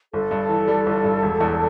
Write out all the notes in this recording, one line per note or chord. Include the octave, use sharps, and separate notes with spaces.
G1 A4
G2
E3
G3
G1
G2
E1
E2